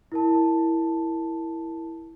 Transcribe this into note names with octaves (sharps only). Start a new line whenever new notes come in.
E4 A#4 A5